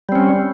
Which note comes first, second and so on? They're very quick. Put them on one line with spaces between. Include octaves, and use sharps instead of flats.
G3 C4 C#4